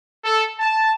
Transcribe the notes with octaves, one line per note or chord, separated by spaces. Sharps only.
A4
A5